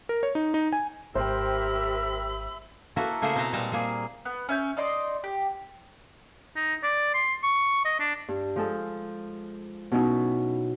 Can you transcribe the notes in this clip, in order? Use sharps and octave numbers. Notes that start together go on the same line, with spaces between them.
A#4
C#5
D#4
D#4
G#5
G#1 G4 A#4 C5 E5 G5 B5 E6
A#3 E4 F#4 A4 B4
C#3 A3 A#3 G#4 C5 F#5
B2 C4 B4 A5 A#5
A#2 G3 G#3 A5 A#5
G3 A#3 G#4
B3
C#4 E5 G6
D#4 D5 D#5 C6
G4
D#4
D5
C6
C#6
D#5
D4
G2
F3 G#3 A4
B2 F#3 C#4 D#4 E4 F#4